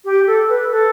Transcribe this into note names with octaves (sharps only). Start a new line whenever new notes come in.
G4
A4
B4
A4